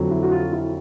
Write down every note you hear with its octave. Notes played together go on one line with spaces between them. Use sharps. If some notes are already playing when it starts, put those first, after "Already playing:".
Already playing: F2 D3 F#3
E4
F#4
F4
E4